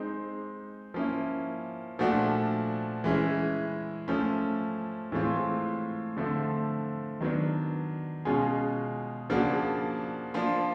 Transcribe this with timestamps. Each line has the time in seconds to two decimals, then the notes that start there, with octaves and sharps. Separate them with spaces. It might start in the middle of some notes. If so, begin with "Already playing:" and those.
Already playing: G#3 C4 D#4
0.94 F3 A#3 C#4 E4
1.99 A#2 F3 A3 D4 F#4
3.04 E3 G#3 C#4 E4
4.08 F3 A3 C#4
5.12 A2 E3 G#3 C4 F4
6.17 D3 F3 A3 C4 F4
7.21 D#3 F#3 B3 D4
8.25 B2 G#3 C#4 F4 G#4
9.30 C#3 F3 A#3 D4 F#4
10.34 F3 A#3 D4 F4